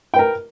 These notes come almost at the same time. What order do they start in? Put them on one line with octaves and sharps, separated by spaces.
G5 B4 A#4